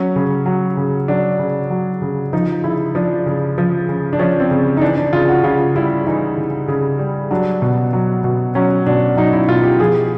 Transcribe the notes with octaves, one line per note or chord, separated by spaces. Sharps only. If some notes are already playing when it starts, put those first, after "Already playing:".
Already playing: F#3 C#4
C#3
F#3
C#3
F#3 D4
C#3
F#3
C#3
F3 D#4
C#3 E4
F3 D4
C#3
F3
C#3
D4
F3 C#4
C4
C#3
D#4
E3 D4
D4
C#3 F4
F#4
C#3 F4
G3 E4
E3 D#4
C#3
C#3
G3
F#3 D4
B2
F#3
B2
F#3 C#4
B2 D4
F#3 D#4
E4
B2 F4
G4
F3 G#4